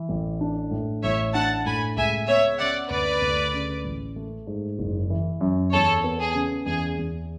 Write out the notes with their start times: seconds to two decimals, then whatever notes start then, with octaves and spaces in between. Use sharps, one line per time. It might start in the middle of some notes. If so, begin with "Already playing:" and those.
Already playing: E3
0.09 A1
0.41 D4
0.71 A2
1.03 A1 C#5 E5
1.34 D4 F#5 A5
1.66 A2 G#5 B5
1.97 C#2 E5 G#5
2.28 B3 C#5 E5
2.59 C#3 D5 F#5
2.90 D2 B4 D5
3.22 D2
3.53 C#3
3.85 A1
4.16 A3
4.47 G#2
4.79 F#1
5.10 E3
5.41 F#2
5.72 E2 A4 C#5
6.04 B3
6.20 G#4
6.35 C#3
6.66 E2 G#4
6.98 E2